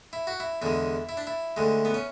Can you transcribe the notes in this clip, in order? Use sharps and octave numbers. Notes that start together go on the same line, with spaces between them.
E4
F#4
E4
E2 D3 G#3 E4
E4
D4
E4
D2 D3 G#3
B3
C#4